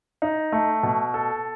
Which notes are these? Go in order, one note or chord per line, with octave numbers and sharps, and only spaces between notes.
D#4
A3
B2
A4